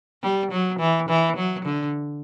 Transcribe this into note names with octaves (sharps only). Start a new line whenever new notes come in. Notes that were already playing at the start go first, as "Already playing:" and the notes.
G3
F#3
E3
E3
F#3
D3